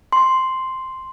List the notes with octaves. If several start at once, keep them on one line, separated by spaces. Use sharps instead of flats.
C6